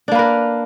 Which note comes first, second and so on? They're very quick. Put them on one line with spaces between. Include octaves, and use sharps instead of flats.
D4 A#3 B4 A#4